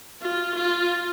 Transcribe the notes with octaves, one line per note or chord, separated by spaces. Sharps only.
F4
F4